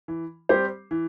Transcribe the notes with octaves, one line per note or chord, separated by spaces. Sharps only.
E3
G3 C4 G4 C5
E3